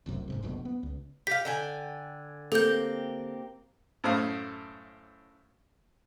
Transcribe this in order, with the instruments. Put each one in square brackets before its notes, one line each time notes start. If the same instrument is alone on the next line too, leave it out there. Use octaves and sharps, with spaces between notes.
[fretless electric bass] F1 C2 F#2 C3
F1 G#2 C3
F1 A#1 F2 B2
B3
C#2
[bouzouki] G4 F5 [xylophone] B6
[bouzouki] D3 G5 G#5
[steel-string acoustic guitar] A#3 C4 G4 [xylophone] A4 G6
[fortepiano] F#2 A2 A4 C5 F5 D#6